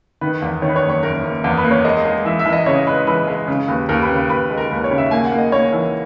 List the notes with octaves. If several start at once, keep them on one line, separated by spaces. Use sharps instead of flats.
D#3 B4
E2
D#3 C#5
B4
C#5
F#1
C#5
F#1 A#4
F#1
E2
B4
A#3
C#5
G#3 D#5
G#3
E3 E5
E5
E3
D#5
C#3 C#5
G#3 B4
E3 B4
G#3
C#3
D#2 B4
D#2 A#4
B4
C#3
B4
D#2 B4
G#3
A#4
D#2 B4
C#5
C#3
E5
A#3 G#5
F#5
A#3
D#5
A#3 C#5
E3